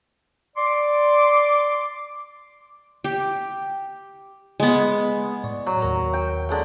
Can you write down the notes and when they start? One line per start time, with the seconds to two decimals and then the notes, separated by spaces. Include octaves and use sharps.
0.57 D5 C6 D6
3.04 G4
4.60 G#3 B3
5.44 A2 D5 C#6
5.66 F#3
5.80 D#2 A#4 A#5
6.13 G5
6.49 D3 G#3 G5